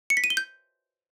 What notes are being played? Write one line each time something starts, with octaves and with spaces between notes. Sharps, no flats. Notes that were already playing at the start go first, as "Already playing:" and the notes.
C#7
B6
D#7
G7
G6